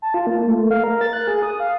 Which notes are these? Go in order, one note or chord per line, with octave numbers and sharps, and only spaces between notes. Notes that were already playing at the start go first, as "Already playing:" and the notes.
A5
F4
A#3
A3
F5
A#4
A6
F#6
G#4
D#6
F5